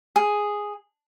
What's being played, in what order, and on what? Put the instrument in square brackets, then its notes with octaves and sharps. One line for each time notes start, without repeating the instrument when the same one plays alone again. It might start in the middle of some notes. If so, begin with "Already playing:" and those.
[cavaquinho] G#4